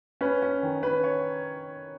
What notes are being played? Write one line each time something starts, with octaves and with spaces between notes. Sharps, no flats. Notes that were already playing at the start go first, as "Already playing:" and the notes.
C#4 B4
C#4
D#3
C#4 B4
C#5